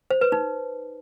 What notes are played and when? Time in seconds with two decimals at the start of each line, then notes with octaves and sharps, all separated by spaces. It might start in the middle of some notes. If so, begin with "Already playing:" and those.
0.10 C5
0.21 B4
0.32 D#4